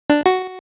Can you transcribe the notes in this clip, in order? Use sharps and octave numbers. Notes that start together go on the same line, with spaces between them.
D4
F#4